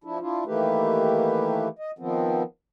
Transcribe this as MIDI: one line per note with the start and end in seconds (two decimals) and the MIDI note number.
0.04 0.20 53
0.04 0.20 62
0.04 0.20 64
0.20 0.44 62
0.20 0.44 64
0.20 0.44 65
0.46 1.68 51
0.46 1.68 52
0.46 1.68 57
0.46 1.68 58
0.46 1.68 67
0.46 1.68 71
1.79 1.91 75
1.99 2.43 51
1.99 2.43 53
1.99 2.43 59
1.99 2.43 60